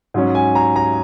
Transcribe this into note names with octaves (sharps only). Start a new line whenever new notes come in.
G#2 F#3 C#4
G#5
A#5
A#5